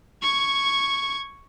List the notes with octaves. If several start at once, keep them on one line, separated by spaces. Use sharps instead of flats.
C#6 G#6